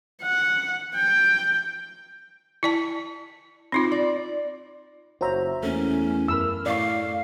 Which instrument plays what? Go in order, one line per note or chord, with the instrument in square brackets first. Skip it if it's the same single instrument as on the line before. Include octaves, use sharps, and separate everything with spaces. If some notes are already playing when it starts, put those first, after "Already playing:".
[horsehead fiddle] F#5
G5
[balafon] E4 D5 A5
C4 D#4 F4
[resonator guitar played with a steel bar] D5
[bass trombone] F#1 [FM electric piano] F#4 E5 [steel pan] C5 C#5 A#5
[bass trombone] E2 [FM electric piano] A3 A#3 [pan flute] C#4
[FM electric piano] F#2 F6 [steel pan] A#4 B5 E6
[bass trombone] A2 [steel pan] D5 C#6 [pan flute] F5